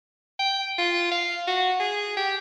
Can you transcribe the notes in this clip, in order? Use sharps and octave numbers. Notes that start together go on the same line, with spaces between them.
G5
F4
F5
F#4
G#4
G4